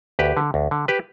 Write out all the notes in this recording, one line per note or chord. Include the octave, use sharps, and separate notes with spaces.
D2 G4 B4
D3
D2
D3
G4 B4